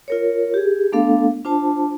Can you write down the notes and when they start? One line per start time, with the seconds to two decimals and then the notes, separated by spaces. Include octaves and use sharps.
0.08 F4 A#4 C#5
0.54 G4 G#4
0.92 A3 B3 D4 A4 F5
1.45 D4 F4 C5 A5